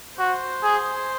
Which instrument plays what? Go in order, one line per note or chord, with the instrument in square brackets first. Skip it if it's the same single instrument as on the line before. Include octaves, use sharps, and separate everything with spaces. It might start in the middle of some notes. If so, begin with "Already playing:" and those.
[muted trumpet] F#4 [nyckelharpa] C5
[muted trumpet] G#4